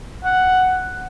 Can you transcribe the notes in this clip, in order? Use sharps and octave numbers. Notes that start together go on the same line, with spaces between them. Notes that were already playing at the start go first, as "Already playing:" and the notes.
F#5